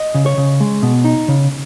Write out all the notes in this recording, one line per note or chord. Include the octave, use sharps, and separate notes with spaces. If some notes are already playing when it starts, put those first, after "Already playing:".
Already playing: D#5
C#3
C#5
C#3
G#3
B2
D#4
C#3